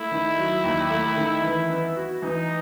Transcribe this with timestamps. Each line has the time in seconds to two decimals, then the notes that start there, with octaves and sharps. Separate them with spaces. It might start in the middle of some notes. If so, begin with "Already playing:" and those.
Already playing: A3 E4
0.12 D#3
0.38 F#3
0.64 D#2
0.90 A3
1.17 D#3
1.43 E3
1.70 B3
1.96 F#4
2.22 E3 D#4